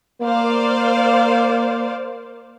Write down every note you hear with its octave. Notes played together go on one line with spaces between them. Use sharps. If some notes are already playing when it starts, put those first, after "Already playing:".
A#3 C5 D5 F5